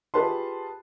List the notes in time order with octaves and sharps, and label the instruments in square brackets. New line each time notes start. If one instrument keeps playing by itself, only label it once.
[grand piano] F4 G4 G#4 B4 A5 C6